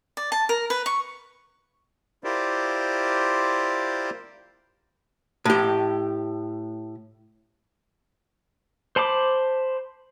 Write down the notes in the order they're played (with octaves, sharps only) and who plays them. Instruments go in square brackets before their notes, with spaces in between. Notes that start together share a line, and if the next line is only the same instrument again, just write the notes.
[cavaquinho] D5
A5
A#4
B4
C#6
[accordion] E4 F4 G4 A#4 C5 D5
[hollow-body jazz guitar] A2 G4
[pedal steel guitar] C5 A5 B5 D6